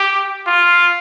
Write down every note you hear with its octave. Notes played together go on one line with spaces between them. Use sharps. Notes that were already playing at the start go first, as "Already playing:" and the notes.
Already playing: G4
F4